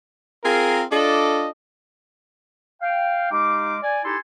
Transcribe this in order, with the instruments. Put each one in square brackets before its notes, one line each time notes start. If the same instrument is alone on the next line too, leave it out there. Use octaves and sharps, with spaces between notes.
[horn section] C4 F4 G#4 A#4
D4 F4 A4 D5 D#5
[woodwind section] F5 G5
G#3 D#4 G4 F5 D6
D5 G#5
D#4 E4 G4 A4 G#5 C6